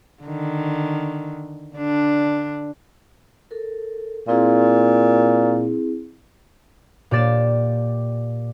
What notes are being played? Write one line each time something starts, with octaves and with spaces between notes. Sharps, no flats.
D3 D#3
D3 D4
A4 A#4
A#2 C4 E4 G#4
A#2 G4 D5 A6 E7